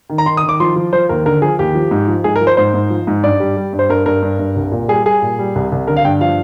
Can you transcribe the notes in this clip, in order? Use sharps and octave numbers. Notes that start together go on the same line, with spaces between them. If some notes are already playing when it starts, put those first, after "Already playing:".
D#3
A#5
D#3 C6
D#6
D#3
D6
F3 C6
F3
F3 C5
D#2 A#4
D3 A#4
F3 G#4
D#2 G4
F3
G#2
F3
G#2 G#4
A#4
F3
C5
G#2 C5
G#2
F3
G#2
G2 D5
G3
G3
G2
C5
G2 A#4
G2 A#4
G2
G2
C2
A#2
G3 G#4
G3 G#4
A#2
G3
C2
C2
D3 A#4
F5
G2 G5
F3 F5